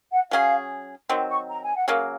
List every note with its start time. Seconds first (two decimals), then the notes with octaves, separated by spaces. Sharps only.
0.12 F#5
0.31 F#3 C#4 G#4 F5
1.09 D#3 F#3 C4 C6
1.30 C#6
1.49 A#5
1.63 G#5
1.76 F#5
1.88 C#3 F#3 A#3 F5